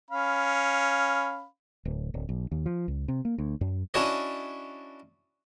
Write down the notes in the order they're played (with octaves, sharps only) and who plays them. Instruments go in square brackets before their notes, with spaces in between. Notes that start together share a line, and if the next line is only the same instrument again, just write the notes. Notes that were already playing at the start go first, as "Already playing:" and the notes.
[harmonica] C#4 F5 B5
[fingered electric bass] D1
D1
B1
D#2
F3
C#2
C3
A#3
D2
F#2
[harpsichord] C#4 D4 E4 F#4 C#5 D#5